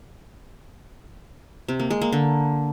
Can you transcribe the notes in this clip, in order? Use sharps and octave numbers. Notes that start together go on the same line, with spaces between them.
C3
A#3
G#3
A#3
D3